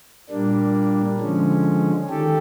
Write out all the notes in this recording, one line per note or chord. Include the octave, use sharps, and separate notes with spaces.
A#2 G3 A#3 D4
D3 F3 G#3 C#4
D#3 G4 A4